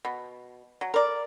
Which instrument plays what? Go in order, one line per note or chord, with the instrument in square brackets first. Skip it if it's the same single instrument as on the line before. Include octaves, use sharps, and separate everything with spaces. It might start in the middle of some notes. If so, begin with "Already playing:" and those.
[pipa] B2
F#3
A#4 D5